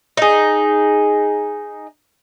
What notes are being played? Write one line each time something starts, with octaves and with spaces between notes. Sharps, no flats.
D#4 G#4